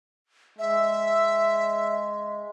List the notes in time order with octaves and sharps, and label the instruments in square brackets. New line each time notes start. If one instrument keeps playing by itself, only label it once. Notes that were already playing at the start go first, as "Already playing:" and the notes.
[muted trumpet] G#3 [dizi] E5